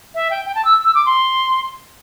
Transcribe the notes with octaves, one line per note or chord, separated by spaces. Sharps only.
E5
G5
G5
A5
E6
E6
D6
C6